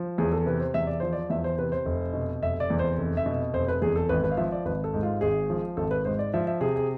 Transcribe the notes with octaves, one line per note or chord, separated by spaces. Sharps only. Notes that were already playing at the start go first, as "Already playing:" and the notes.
Already playing: F3
E2 G#4
A4
C3 B4
C5
E2 E5
D5
F3 C5
D5
E2 E5
C5
C3 B4
C5
F1
B2
F1 E5
D5
E2
C5
F1
E5
B2
F1 C5
B4
E2 G#4
A4
G#1 B4
B4
F5
F3 E5
D5
G#1 B4
A4
G#2
F4
G#1 G#4
F3
G#1 A4
B4
G#2 C5
D5
F3 E5
E5
C3 G#4
G#4